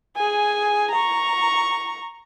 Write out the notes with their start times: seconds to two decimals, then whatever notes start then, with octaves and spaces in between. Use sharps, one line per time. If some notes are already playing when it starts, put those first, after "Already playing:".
0.16 G#4 G#5
0.91 A#5 C#6